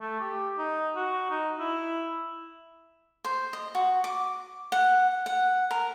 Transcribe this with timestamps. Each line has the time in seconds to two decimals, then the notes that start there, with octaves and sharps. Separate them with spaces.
0.01 A3
0.20 G4
0.58 D#4
0.96 F#4
1.31 D#4
1.59 E4
3.24 C5
3.53 D#5
3.75 F#4
4.04 D6
4.72 F#5
5.26 F#5
5.71 A#4